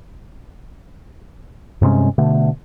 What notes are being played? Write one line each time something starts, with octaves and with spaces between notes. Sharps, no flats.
G2 C3 G#3 C#4
B2 D3 A3